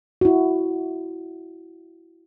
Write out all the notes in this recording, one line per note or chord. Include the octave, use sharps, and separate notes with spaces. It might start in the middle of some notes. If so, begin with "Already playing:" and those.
E4 F#4